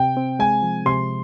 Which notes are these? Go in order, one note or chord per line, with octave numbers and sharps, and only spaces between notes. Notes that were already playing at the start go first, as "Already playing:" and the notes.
Already playing: C3 G5
C4
G#3 G#5
F3
C3 C6